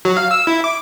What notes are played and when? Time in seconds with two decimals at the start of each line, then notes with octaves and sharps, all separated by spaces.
0.05 F#3
0.17 F5
0.31 E6
0.47 E4
0.64 D6